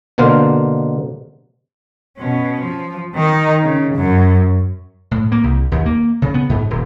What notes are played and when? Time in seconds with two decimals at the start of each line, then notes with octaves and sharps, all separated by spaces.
0.18 B2 D3 A#3 C5 F5
2.17 B2 C#4
2.62 F3
3.15 D#3 D#4
3.63 C#3
3.95 F#2
5.11 A2
5.32 A#3
5.44 C2
5.71 D#2
5.86 A#3
6.22 C#3
6.34 B3
6.49 G#2
6.70 D#1